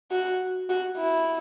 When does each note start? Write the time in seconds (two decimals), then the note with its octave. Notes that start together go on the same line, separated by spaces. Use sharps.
0.11 F#4
0.69 F#4
0.98 E4